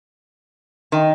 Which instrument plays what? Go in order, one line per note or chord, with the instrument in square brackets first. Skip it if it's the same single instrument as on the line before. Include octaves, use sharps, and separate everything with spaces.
[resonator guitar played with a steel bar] D#3 [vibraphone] D#5 G5